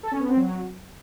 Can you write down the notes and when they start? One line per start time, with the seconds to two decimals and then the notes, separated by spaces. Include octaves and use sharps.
0.03 A4
0.12 C#4
0.20 B3
0.28 C4
0.37 F#3